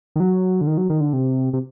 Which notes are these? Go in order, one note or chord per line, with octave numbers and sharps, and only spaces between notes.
D#3
F#3
D3
D#3
F#3
D#3
D3
C3
C3